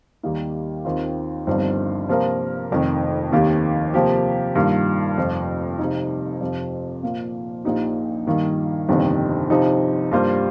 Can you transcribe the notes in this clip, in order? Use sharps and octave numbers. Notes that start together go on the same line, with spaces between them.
D#2 D#3 G3 A#3 D#4
D#2 D#3 C4 F4
G1 G2 F3 C4 D#4
C3 F3 A#3 F4 A#4
F1 F2 D#3
D#2 D#3 A#3 G4
C3 F3 A#3 G4
G2 D#3 A#3 F4
F1 F2 F3
C3 F3 D#4
F2 C3 F3
A#2 A#3 F4
A#1 A#2 F3 D#4 G4
G2 D#3 A#3 D#4
G1 F2 C3 D#3 A#3
C3 F3 D#4
G2 G3 A#3 F4 C5